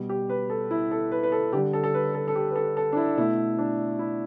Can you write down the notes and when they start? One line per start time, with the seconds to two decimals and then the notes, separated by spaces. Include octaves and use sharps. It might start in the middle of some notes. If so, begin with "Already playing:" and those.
Already playing: B2 G3
0.09 G4
0.30 B4
0.50 A4
0.71 E4
0.91 A4
1.12 B4
1.23 B4
1.32 A4
1.53 D3 G3 G4
1.73 A4
1.84 A4
1.94 B4
2.15 A4
2.28 A4
2.35 G4
2.51 B4
2.56 A4
2.77 A4
2.93 D4
2.97 E4
3.17 B2 A3 E4
3.58 D4
3.99 E4